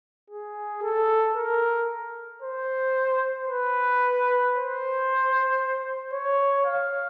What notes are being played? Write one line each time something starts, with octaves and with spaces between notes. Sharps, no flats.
G#4
A4
A#4
C5
B4
C5
C#5
F5